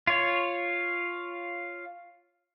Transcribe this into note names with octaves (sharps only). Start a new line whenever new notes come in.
F4 C#5